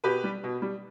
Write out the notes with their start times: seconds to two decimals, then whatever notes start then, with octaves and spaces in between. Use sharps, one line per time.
0.04 B2 G4 B4
0.24 G3
0.44 B2
0.62 G3